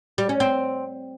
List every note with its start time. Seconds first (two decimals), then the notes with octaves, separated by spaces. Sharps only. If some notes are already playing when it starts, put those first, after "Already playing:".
0.18 G3
0.29 C#4
0.40 C4